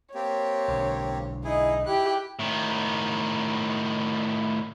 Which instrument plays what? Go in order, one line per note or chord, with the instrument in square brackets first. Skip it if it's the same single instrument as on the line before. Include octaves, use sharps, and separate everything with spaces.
[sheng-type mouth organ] A#3 C4 G4 [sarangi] C#5
[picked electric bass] B1 D3
[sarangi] D#4 [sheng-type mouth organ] E4 G#4
[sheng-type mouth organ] E4 F#6 [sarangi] G4
[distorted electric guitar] A2 D#3